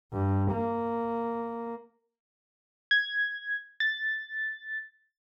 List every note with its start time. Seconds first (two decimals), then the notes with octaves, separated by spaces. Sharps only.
0.13 G2
0.52 A#3
2.91 G#6
3.80 A6